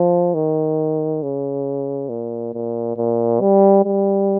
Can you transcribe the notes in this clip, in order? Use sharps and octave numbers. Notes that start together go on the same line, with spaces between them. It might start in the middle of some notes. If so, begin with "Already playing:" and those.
Already playing: F3
D#3
C#3
A#2
A#2
A#2
G3
G3